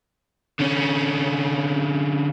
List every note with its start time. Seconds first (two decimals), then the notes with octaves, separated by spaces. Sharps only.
0.59 D3 C#4